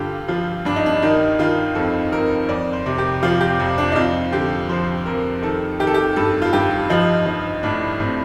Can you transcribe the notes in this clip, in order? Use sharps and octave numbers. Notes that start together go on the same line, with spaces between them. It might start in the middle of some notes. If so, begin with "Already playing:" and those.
Already playing: G2 D3 F4 G4
F3 F4
G2 D4
D#4
D4
D#3 D#4
D#3 F4
F2 A4
F2 A#4
F2 D5
C5
C3
G4
F3 F4
G4
F2
D4
D#4
F2 F4
D3 G4
F3 C5
F2 A#4
D#3 A4
D#3 G4
A4
G4
G2 A4
F4
G2 G4
F3 D#4
F3 D#4
A2 D4
A2 C4